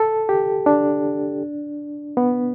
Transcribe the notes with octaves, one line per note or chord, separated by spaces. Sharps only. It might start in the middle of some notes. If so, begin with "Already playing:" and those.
Already playing: A4
G4
D4
B3